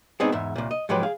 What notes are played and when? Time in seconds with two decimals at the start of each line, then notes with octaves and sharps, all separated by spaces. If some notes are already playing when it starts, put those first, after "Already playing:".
0.20 G#3 B3 C4 D4 D#4 G#4
0.32 E2 G#2 E5
0.56 C2 A#2
0.71 D#5
0.89 G#2 F3 F#3 G#3 G4 B4
1.03 G#4 F5